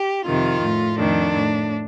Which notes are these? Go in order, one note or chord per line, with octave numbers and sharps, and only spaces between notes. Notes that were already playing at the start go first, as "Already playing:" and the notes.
Already playing: G4
F2 C3 D#3 F4
A2
F2 D#3 D4
A2